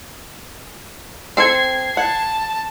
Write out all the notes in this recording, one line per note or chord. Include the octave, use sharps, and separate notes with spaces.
C4 A4 G#6 C7
F#5 A5